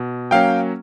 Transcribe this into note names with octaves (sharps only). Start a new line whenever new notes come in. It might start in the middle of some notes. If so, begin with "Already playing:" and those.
Already playing: B2
F#3 A#3 C#4 F5 G5